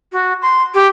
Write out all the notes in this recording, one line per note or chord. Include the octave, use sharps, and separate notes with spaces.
F#4
C6
G4